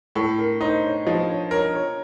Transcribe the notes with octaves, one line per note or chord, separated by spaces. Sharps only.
A2 A4
A#4
D#4 C5
C#5
F3 D#5
C#5
A#4 C#5
C#5